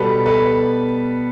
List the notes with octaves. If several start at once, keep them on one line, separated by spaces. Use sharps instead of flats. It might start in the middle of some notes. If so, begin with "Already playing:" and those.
Already playing: B2 G3 B3 A4 B4
A4 B4